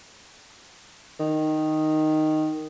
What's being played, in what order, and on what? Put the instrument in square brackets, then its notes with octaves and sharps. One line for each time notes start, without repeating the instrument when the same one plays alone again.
[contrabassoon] D#3